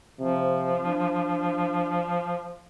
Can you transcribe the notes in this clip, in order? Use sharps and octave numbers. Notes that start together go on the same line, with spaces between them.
C3 F3
D4